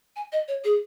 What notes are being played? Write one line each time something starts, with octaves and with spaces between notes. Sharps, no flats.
G#5
D#5
C#5
G#4